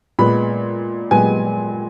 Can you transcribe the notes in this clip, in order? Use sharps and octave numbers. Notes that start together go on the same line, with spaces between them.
A#2 G#3 B3 B5
A#2 G#3 B3 G#5